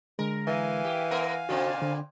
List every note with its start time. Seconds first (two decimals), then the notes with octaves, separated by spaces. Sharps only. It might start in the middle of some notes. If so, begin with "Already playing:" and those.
0.19 D3 G#3 A#4
0.48 E3 F5 G#5
0.85 G4
1.11 B3 A#4 F#5
1.49 A#2 C#3 C4 F#4
1.82 D3